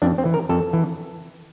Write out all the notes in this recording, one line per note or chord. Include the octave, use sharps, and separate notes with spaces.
F2 D4
C4
E3
A#4
F2 A4
E3